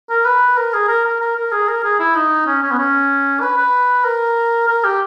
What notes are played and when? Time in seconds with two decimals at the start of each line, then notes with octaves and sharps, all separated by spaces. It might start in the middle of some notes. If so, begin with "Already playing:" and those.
0.10 A#4
0.25 B4
0.57 A#4
0.74 G#4
0.88 A#4
1.05 A#4
1.20 A#4
1.36 A#4
1.52 G#4
1.68 A#4
1.84 G#4
2.00 E4
2.15 D#4
2.47 C#4
2.63 C#4
2.72 B3
2.79 C#4
3.41 B4
3.57 B4
4.04 A#4
4.68 A#4
4.84 G4